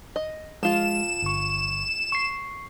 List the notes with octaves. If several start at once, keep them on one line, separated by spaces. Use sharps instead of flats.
D#5
F3 G#3 F4 E7
G1 C#6
C#6 C7